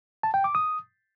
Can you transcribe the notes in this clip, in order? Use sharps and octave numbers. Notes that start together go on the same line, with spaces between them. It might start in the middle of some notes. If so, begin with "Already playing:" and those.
A5
G5
D6
D#6